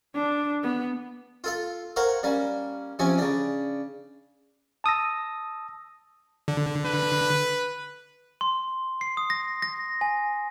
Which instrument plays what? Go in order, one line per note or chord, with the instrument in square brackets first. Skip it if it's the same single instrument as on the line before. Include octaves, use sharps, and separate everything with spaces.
[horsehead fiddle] D4
B3
[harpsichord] F4 A4 F5
A#4 C5 C#5 F5 F#5
G3 A#3 C#4
C3 F3 C#4 G#5
C#3 D4
[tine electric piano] A5 D#6 E6 A#6
[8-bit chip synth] D3
[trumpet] B4
[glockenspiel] C6
C7
D#6
A#6
A#6
G#5